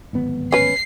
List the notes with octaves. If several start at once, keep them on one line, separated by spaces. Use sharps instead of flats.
D1 G#1 B3
C#4 B4 C7